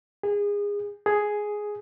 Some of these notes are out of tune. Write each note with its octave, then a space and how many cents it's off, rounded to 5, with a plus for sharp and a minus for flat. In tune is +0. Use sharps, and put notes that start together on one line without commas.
G#4 -25
G#4 +5